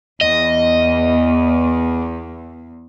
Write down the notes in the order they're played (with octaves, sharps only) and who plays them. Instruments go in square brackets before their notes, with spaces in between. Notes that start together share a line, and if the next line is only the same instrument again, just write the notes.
[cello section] E2 [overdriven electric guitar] D#5